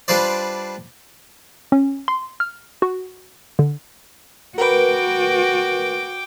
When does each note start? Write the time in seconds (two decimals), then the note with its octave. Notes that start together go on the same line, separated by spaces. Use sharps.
0.08 G3 D4 F4 B4 C5 D5
1.72 C#4
2.08 C6
2.40 F6
2.82 F#4
3.59 D3
4.58 F#4 A#4 B4 G5 D6